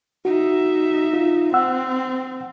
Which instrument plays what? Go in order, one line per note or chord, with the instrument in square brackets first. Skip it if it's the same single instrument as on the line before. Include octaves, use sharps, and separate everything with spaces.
[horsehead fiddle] D#4 E5 [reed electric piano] F#4
[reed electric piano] F4
[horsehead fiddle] C4 [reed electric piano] F#5 E6